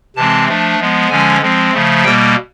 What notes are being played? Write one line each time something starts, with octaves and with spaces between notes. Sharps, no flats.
C3 E3 G#3 C4 A5
F3 A3 D4
F3 G#3 B3
D3 F3 G#3 C#4 G#5
F3 G#3 C4
C#3 F3 A3
B2 G3 A#3 G5